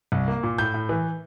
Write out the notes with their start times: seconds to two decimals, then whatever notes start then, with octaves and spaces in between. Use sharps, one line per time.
0.12 C2
0.28 A#3
0.43 A#2
0.58 A2 G6
0.74 A2
0.89 E3